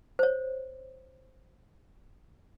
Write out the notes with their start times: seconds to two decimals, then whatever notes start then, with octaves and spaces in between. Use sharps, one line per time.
0.19 C5 C#5